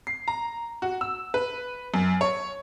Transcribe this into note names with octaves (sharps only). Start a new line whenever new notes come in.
C7
A#5
F#4
E6
B4
F#2
C#5